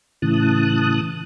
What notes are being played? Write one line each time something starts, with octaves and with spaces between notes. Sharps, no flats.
A2 C#3 E3 A5 D#6 F#6